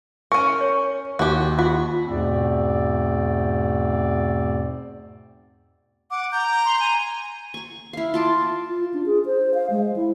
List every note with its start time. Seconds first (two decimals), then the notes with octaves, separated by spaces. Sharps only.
0.32 C#4 A#4 C#6
0.61 C#5
1.19 D#2 F#4 G4
1.59 F4 F#4
2.05 E2 G#2 B2 A3 C4 D5
6.11 F#5 D6
6.32 A#5 G6
6.65 C6
6.80 G#5
7.54 G#5 C#6
7.93 E4 F5
8.14 F4 A5 D6
8.68 F4
8.94 D4
9.06 G#4
9.26 C5
9.54 F5
9.71 G#3
9.96 E4